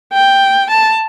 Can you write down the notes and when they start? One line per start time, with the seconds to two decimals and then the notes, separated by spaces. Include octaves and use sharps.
0.13 G5
0.70 A5